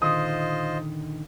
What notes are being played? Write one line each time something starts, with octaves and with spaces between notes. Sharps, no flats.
A#2 D3 D#3 F4 C5 D#5 D#6